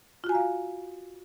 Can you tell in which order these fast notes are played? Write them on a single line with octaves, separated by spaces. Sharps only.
F4 F#4 G#5 A#5 F5